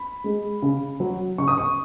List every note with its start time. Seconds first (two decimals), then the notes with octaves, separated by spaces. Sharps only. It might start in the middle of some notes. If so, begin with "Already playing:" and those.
Already playing: B5
0.24 G#3
0.62 C#3
1.00 F#3
1.38 C#3 C#6
1.48 D#6
1.58 C#6